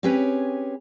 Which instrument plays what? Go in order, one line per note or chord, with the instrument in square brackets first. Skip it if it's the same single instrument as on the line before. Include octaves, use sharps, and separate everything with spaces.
[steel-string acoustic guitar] C4 C#4 G4 G#4 B4 C#5